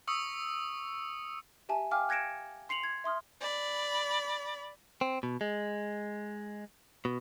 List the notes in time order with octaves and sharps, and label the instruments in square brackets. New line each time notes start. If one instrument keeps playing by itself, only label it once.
[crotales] C#6 D#6 E6 C#7
[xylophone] G4 E5 G#5 A5
F5 G5 G#5 D6 F6
F#6 G#6 A#6 C#7 D7 E7
C6 C7 C#7 F7 F#7
G#6
E5 C6 D#6 F6
[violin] D5 B5
[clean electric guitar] C4
B2
G#3
B2